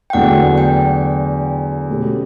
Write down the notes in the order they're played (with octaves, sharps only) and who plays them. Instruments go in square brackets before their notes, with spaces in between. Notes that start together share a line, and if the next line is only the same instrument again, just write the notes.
[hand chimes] G5
[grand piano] E2 D3 F#3 A3 [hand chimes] F#5
[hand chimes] G5
[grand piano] B2 A3 C#4 G4